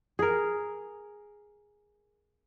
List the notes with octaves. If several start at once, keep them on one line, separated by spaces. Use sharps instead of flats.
G#4 A#4